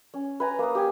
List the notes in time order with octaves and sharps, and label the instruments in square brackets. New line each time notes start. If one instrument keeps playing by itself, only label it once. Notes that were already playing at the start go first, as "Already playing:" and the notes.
[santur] C#4
B4 G#5 A#5
A#3 D#6
G4 G#5